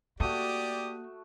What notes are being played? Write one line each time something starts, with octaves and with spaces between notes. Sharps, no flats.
A3 A#3 F#4 G4 D5 D#6